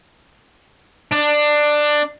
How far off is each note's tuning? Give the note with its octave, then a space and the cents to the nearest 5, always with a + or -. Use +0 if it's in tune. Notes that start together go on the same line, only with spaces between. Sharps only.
D4 +15